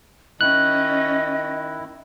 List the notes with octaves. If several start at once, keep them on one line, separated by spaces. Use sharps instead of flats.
D#3 C#4 E4 D#5 F#6